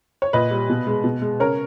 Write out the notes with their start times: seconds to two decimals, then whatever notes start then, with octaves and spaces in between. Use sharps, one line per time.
0.22 C#5
0.33 A#2 B4 D#5
0.51 G3
0.69 B2
0.87 G#3
1.04 B2
1.22 G#3
1.40 C#3 A#4 C#5